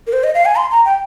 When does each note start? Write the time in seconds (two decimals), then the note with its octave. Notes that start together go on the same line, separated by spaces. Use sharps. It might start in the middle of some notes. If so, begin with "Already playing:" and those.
0.07 A#4
0.13 C5
0.24 D#5
0.35 F5
0.45 G#5
0.56 C6
0.71 A#5
0.85 G5